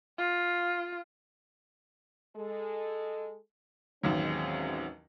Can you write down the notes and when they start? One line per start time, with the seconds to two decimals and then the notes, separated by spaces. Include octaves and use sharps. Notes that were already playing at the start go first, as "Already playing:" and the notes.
0.18 F4
2.37 G#3 A4
4.03 A1 D#2 F#3 G#3 C4 C#4